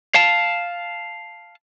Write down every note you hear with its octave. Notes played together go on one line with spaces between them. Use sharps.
F5 A5